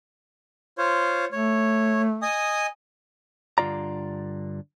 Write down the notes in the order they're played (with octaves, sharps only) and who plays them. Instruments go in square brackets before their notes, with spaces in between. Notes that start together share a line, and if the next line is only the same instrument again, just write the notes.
[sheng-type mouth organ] F4 C5 C#5
[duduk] A3 [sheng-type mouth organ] C#5
[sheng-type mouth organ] D#5 G#5 D#6
[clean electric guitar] G2 D3 F3 F4 D5 A#5